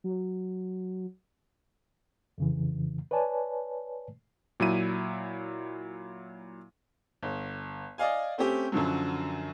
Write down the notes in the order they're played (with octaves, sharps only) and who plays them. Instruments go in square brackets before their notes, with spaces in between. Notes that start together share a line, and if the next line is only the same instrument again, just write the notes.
[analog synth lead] F#3
[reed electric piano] F2 C#3 E3
B4 C#5 D5 G#5 A5
[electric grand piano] A#2 F#3 E4 D#7
[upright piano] G1
D5 D#5 F5 G#5
A3 C4 C#4 G4
F#2 D3 F3 F#3